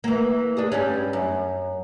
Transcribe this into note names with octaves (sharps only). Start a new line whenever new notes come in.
E3 A#3
D4 G#4
G2 G3 C#4
F#2